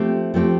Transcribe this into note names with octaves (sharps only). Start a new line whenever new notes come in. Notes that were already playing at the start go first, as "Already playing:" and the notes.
Already playing: F3 A3 C4 G4
F3 A3 C4 G4